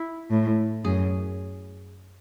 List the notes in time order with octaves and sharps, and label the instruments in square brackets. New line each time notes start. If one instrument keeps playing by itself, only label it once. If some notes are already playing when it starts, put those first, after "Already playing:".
Already playing: [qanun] E4
[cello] A2
[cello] F#2 [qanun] G#4